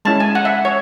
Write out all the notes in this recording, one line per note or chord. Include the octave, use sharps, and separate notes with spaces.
G#3 C#4 E4 A5
G#5
F#5
E5
C#5